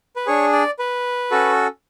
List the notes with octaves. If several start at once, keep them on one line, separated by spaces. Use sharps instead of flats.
B4
D4 G#4 C#5
D5
B4
C#4 F#4 A4